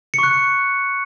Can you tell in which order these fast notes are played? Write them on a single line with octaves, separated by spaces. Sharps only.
C#7 C#6 F#6